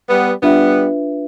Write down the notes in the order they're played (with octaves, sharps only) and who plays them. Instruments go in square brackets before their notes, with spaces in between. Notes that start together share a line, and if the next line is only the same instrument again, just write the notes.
[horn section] G3 B3
[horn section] G3 B3 [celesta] D4 F4 B4 E5